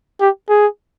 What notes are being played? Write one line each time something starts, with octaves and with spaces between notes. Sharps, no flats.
G4
G#4